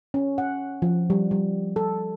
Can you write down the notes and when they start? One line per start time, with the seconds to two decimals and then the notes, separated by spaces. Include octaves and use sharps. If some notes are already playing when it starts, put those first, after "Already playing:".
0.14 C#4
0.38 F#5
0.82 F3
1.10 G3
1.31 G3
1.76 A4